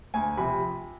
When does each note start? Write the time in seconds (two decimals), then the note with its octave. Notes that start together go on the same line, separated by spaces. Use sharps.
0.14 D2 G#5
0.37 C3 F3 B5